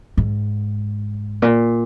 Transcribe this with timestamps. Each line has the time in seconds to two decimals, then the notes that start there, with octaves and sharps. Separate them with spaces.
0.17 G#2
1.42 A#2